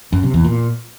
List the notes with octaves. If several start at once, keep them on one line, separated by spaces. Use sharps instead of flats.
F#2
C3
E2
A#2